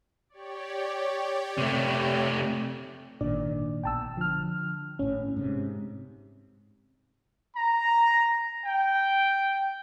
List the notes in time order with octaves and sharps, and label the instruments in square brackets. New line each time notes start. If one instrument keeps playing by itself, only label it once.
[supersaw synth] G4 C#5 D5
[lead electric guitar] C3 A3
[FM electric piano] G#1 D4 D5 [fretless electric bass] A#2 D#3
[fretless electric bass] A#1 B2 [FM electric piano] G5 A5 E6
[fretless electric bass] D3 [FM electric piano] F3 F6
[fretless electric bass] G#1 A2 [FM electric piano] C#4
[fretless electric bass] G#2 C3
[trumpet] A#5
G5